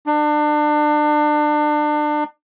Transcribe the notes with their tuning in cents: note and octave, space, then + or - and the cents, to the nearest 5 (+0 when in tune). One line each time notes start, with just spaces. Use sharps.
D4 +30